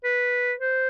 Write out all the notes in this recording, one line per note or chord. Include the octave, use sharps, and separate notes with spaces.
B4
C5